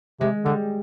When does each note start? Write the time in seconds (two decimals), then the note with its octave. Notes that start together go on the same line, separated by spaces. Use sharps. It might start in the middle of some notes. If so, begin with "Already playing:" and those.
0.21 C3 G#3
0.45 D3 G3